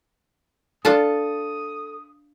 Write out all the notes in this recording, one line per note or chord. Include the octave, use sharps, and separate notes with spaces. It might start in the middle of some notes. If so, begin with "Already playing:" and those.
D4 F4 A4 A5 D#6